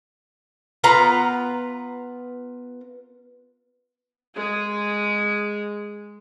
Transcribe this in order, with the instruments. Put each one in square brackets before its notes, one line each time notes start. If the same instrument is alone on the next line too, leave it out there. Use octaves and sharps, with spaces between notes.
[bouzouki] B3 F4 B4 A#5
[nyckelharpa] G#3 G#4